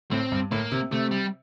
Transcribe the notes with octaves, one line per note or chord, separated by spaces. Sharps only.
A2 C4
G2
A2 A#3
C3
C3 A3
G3